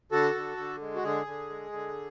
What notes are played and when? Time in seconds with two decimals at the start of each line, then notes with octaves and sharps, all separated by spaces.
0.12 D3 F#4 A4
0.35 D3
0.57 D3
0.81 G#3
0.95 F#4
1.03 D3 G#4
1.27 D3
1.50 G#3
1.72 D3